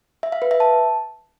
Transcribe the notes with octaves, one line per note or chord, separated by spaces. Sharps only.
E5
F5
B4
E5
A5